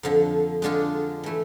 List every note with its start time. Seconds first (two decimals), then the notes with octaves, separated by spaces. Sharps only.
0.03 F2 D3 F3
0.62 D3 G#3 D4 F4
1.23 E3 A3 E4